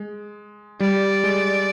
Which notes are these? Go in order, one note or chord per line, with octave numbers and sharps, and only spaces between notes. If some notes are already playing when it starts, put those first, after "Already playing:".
Already playing: G#3
G3 D5
G#3